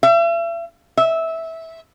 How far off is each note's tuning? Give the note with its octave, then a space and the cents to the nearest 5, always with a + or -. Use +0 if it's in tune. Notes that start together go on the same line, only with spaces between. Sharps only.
E5 +40
E5 -15